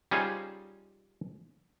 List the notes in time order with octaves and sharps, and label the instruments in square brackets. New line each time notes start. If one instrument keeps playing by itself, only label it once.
[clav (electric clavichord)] G3 C#4 D#4 F4 G#4 C5